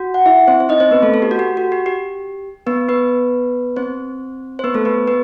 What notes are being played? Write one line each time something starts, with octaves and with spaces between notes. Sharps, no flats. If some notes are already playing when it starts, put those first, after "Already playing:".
Already playing: F#4
F#5
E4 E5
C4 C5
C5
D#4 D#5
C4 C5
B3 B4
A3 A4
A4
G4
F#4
G4
F#4
G4
G4
B3 B4
B3 B4
C4 C5
C5
B3 B4
A3 A4
B3 B4
B3 B4